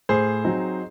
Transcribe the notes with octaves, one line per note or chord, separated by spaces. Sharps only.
A2 G#4 C5
F#3 C4 D#4